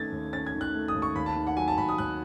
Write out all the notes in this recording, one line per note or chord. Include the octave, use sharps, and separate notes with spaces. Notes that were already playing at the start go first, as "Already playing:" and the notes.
Already playing: D#3 A3 C#4 G#6 A6
D#2
C#4 A6
G#6
D#3
F#6
A3
D#6
D#2
C#6
D#2 B5
A5
D#3
F#5
F#3 G#5
A5
D#2 B5
D#6
D#2 F#6